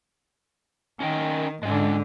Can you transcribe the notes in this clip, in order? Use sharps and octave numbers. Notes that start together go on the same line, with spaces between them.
D#3 C#4 A#4 G5
G#2 D3 G#3 C#4